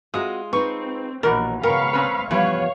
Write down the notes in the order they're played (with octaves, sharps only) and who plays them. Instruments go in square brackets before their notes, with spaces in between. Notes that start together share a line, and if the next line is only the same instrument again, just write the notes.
[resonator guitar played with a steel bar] G#3 F4 [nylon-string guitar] C4 F#4 [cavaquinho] D#6
[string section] C4 [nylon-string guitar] D#4 B4 [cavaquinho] C#6
[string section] A#1 D#2 [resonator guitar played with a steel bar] B2 E3 F#4 [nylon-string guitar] D4 [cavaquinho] A#4
[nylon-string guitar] C#3 B3 G5 [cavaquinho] A#4 [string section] F5 B5 C#6
[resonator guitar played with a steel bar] C4 C#4 B4
[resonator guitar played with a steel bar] E3 [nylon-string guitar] F3 G3 B3 [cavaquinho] B4 [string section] C#5 F5